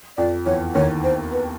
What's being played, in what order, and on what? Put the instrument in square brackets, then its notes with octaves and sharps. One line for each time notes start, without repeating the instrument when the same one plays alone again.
[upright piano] F2 F3 [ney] D5
[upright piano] E2 E3 [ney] C#5
[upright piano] D#2 D#3 [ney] C#5
[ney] C5
B4